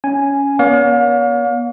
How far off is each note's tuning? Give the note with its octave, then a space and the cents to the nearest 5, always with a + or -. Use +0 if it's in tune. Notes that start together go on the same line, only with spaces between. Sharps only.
C#4 +10 G#5 +0
B3 -45 C#5 +45 F5 +35